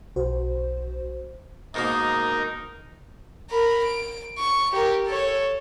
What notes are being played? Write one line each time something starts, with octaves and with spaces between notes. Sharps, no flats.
B1 F#4 C5
G#2 B2 A#3 D#4 A#4
A#4 B5
D7
C#6
G4 A#4
A4 C#5